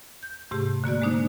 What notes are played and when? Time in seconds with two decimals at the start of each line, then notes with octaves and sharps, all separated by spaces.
0.23 G6
0.51 G#2 C3 A3 G4
0.84 D3 A#3 F#4 D5
1.02 G#3 A#3 D4 D#4 C5